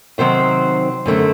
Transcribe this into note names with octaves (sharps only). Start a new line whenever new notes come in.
C3 D#3 F#3 C4 C5
F#2 D3 A3 C4